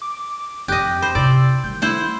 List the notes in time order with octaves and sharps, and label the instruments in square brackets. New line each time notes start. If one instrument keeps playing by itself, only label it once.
[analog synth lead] D6
[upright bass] F2 [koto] G4 D#5 [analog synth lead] F#6
[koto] C5 [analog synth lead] B5
[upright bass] C3 E4 [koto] D5 [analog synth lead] E6
[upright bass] D#3 G3 [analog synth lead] G6
[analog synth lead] A3 [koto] E4 C5 F#5